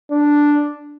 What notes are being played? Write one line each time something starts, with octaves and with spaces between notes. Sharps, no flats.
D4